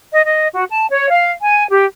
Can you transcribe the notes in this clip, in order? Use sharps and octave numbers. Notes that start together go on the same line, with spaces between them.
D#5
D#5
F#4
A5
C#5
F5
G#5
G4